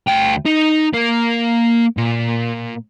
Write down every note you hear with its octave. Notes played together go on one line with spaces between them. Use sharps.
D2 G5
D#4
A#3
A#2